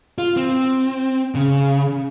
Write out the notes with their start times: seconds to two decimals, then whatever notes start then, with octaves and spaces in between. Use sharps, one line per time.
0.18 F4
0.37 C4
1.35 C#3